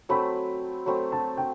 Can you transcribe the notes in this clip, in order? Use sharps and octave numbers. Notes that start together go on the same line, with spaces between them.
F#3 A3 C4 B5
F#3 A3 C4 B5
A5
G5